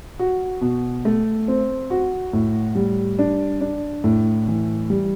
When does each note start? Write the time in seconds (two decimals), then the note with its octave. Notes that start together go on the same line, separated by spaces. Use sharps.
0.19 F#4
0.61 B2
1.05 A3
1.48 C4
1.90 F#4
2.33 A2
2.75 G3
3.19 D4
3.61 D4
4.04 A2
4.48 E3
4.90 G3